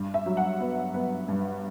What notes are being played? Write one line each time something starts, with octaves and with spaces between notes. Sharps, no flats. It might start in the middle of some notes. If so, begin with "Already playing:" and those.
Already playing: G2
E5
F#3
F#5
B3
B3
G2